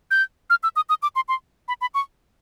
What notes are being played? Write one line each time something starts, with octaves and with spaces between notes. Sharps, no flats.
G6
F6
E6
D#6
D#6
D6
C6
C6
B5
B5
C#6